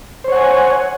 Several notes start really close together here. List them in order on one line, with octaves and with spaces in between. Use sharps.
C5 C#5 F#5 G#5